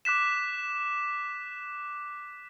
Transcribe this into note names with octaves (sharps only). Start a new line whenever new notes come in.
D6 F#6 B6 E7